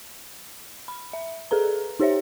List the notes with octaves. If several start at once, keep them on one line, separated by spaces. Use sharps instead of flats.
B5
E5
G#4 A4 B4 A#5
D#4 G4 C5 C#5 E5